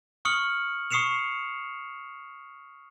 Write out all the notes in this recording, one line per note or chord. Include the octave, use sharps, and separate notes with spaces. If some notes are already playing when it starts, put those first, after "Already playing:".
C#6 D#6 F6 C#7 F#7
C#6 D#6 C7 C#7 E7 F7